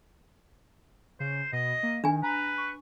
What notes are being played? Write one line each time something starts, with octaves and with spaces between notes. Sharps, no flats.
C#3 C5
B2 D#5
A#3
D#3 D4 G#5
B4 A#5
C#6